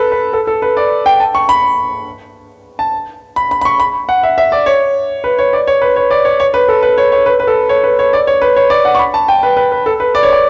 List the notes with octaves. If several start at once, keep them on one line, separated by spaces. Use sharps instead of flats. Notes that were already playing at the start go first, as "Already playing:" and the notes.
Already playing: A4 B4
B4
A4
A4
B4
D5
G5
A5
C#6
B5
A5
B5
B5
B5
C#6
B5
F#5
E5
E5
D5
C#5
B4
C#5
D5
C#5
B4
C#5
D5
C#5
C#5
B4
A4
B4
C#5
C#5
B4
B4
A4
C#5
B4
C#5
D5
C#5
B4
C#5
D5
F#5
C#6
B5
A5
G5
B4
B4
B4
A4
B4
D5
C#5
D5